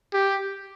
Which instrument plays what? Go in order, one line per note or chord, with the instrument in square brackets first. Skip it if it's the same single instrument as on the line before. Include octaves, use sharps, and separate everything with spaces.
[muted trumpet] G4